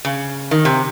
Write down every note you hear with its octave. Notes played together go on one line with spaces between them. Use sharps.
C#3
D#3
C3